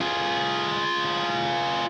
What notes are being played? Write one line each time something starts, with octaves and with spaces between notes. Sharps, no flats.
F4 G#4